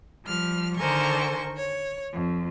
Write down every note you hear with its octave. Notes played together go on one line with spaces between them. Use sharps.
F3 G3 F6
D3 D#3 A#4 C5 G#5 C#6
C#5
F2